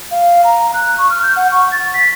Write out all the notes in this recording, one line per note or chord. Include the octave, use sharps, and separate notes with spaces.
F5
A#5
F#6
C#6
F6
G6
F#5
C#6
A6
B6